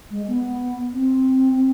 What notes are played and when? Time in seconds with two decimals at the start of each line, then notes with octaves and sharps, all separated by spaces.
0.11 G#3
0.28 B3
0.93 C4